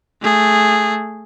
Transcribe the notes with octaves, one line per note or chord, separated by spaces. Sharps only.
A3 G#4